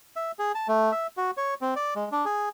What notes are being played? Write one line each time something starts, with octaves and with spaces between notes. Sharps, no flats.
E5
G#4
A5
A3
E5
F#4
C#5
C4
D5
G#3
D4
G#4